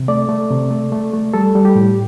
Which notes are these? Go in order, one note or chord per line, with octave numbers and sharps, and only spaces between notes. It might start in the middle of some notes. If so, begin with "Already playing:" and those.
Already playing: C3
A3 D5
A3
C3
A3
A3
A3
G3 A4
G3
G4
A2